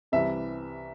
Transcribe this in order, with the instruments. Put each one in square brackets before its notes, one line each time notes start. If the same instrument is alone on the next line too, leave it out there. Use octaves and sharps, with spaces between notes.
[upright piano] C2 C3 E3 E5